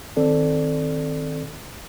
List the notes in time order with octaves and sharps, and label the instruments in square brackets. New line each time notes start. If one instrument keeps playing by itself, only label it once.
[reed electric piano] D#3 C4 A4 D5